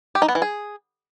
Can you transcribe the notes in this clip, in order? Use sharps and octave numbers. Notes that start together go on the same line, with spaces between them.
G4
D#4
B3
E3
G#4